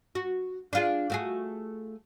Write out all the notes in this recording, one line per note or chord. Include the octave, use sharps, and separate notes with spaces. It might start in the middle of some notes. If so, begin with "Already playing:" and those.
F#4
D4 F4 G#4
A3 F#4 G#4